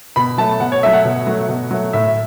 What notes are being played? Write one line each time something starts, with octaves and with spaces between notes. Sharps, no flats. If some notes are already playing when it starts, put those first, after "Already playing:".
B2 B5
F#3 A3 A5
B2 F#5
C#5
F#3 A3 E5
F#5
B2
F#3 A3
B2
F#3 A3
A2 E5